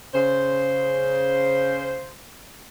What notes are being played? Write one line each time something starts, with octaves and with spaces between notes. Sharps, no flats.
C#3 C5